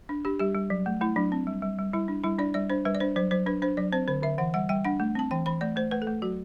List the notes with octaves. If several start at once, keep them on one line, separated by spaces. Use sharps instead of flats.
D4
D4 G4
G3 G4
G3
F#3
A3
A3 E4
F#3 D4
C4
G3
G3
G3
G3 E4
D4
G3 E4
D4 D5
G3 D5
D4 C5
G3 B4
D5
D4 C5
F#3 C5
F#3 C5
D4 B4
D4 C5
F#3 D5
C4 C5
D3 C5
D3 E5
E3 F#5
G3 F#5
G3 G5
D4 F#5
A3
C4 A5
E3 G5
E3 B5
A3 D5
A3 C5
A3 B4
A4
A3
F#3 F#4